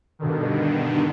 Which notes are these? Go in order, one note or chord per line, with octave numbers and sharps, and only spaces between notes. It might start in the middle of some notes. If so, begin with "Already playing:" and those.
G2 B2 D3 D#3